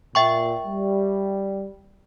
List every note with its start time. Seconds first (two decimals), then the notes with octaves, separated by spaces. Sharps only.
0.15 A#2 E5 G5 C#6
0.66 G3